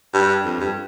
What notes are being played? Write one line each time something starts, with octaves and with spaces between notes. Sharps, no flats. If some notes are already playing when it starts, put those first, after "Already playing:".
G2
F2
G2